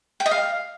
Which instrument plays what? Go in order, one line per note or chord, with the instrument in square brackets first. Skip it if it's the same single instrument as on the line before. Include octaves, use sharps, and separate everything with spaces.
[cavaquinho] G5
D#5
F5